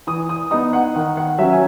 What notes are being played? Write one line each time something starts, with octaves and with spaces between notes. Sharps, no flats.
E3 D#6
D#6
B3 D#4 D#6
F#5
D#3 F#5
F#5
F#3 C#4 E5
G#5